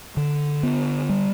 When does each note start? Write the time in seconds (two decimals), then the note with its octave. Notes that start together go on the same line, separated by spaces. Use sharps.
0.17 D3
0.63 B3
1.09 G3